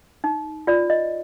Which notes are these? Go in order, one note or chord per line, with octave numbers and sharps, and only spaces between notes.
D#4
F4 D5
D#5